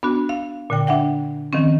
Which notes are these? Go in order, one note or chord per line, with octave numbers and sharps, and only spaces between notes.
B3 D4 F#4
F5
A#2 D3 G5
D4 E5 F#5 G5
D#3 F3 C4 C#4